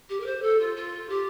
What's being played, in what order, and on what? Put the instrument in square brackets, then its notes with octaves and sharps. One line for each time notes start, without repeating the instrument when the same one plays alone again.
[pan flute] G4
A#4
C5
A4
F4
F4
G4